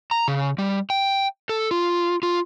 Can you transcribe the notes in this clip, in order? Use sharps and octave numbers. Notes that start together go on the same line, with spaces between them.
A#5
C#3
G3
G5
A4
F4
F4